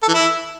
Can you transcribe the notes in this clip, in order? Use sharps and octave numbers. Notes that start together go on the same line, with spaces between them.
A4
E3
E4